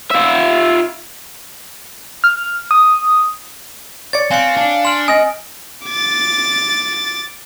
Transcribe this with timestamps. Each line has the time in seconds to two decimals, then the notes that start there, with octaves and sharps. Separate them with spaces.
0.11 F4 E5
2.24 F6
2.71 D#6
4.13 C#5 D5 A6 C#7
4.31 C4 F5 G#5 F#6 C#7
4.57 D4
4.85 C6 F6 F#7
5.08 D#5 G#5 D#6 A#6
5.86 D6 A6